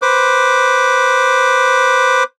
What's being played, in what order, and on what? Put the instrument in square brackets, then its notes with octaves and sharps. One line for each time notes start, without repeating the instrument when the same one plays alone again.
[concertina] B4 C5 D6